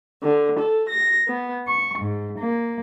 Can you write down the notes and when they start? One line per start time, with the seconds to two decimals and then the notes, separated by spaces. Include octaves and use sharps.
0.22 D3
0.59 A4
0.88 A#6
1.27 B3
1.67 C#6
1.99 G#2
2.39 A#3